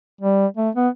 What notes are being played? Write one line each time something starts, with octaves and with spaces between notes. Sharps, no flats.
G3
A3
B3